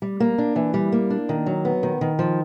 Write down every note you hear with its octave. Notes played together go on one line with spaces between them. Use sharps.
G3
A#3
D4
E3
G3
A#3
D4
D#3
F#3
B3
D#3
D#3
F3